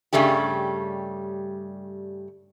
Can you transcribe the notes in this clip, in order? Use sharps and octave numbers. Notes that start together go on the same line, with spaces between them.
G2 C#3 G3 A3 G4